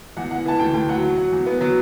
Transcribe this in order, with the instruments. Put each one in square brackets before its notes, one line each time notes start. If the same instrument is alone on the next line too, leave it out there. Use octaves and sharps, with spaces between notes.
[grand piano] E2 F#5
E3 F#5
E3 A5
D2 G5
D2 G5
F#3 F#5
F#3
F#3
E2
B3
F#3